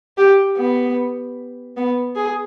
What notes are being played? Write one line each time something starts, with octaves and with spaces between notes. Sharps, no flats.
G4
B3
B3
G#4